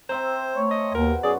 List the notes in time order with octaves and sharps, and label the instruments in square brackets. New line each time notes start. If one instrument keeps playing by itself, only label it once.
[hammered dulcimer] C4 E5 A#5 [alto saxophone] C5
[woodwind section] A3 C#5
[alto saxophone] D#5
[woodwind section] D#2 [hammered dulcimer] B2 [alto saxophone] A#4
[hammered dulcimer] F#2 [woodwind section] G#4 [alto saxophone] D5